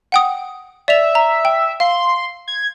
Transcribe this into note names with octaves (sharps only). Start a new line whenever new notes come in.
F#5 G5 D#6
D5 E5 F7
A#5
G5
F5 C6
G#6